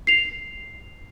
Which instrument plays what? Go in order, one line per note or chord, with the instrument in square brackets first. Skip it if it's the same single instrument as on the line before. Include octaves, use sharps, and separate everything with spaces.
[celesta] C7 F7